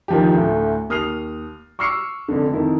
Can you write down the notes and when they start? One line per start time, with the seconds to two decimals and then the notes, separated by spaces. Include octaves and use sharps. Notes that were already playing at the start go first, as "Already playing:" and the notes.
0.08 D#3 F3 G4
0.34 D2 A2
0.89 D#2 D#6 F6 C7 F7
1.79 C#6 D6 E6 F6 C7 C#7
2.28 F1 F2 D3
2.53 F2 D#3 E4